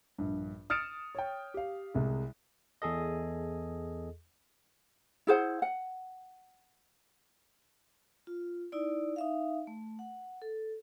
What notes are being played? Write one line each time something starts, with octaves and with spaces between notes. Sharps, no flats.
A#1 G2
D#6 F6 A6 C#7 D7 E7
C#5 G5
G4 F5
C2 C3 G#3
E2 G#4 A4 D#5
E4 G#4 C5 F#5
F#5
F4
D#4 E4 D5
D#4 E5 F5
A3
F#5
A4